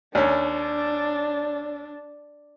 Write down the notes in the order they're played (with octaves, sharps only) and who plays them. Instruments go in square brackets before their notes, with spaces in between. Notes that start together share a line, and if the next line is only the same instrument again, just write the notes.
[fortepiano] D#2 C#4 [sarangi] D4